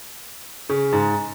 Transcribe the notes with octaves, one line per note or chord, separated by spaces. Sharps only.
C#3
G#2